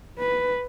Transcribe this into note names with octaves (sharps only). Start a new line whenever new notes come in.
B4